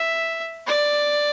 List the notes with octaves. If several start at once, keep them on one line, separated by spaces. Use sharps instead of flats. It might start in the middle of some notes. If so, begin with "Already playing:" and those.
Already playing: E5
D5